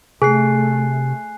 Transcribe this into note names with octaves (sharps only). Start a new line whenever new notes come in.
C3 A3 G#4 G#5 F#6 C7